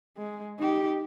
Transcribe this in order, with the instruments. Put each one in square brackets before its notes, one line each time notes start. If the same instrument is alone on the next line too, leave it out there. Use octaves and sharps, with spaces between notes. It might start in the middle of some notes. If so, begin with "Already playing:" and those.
[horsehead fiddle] G#3
D#4 G4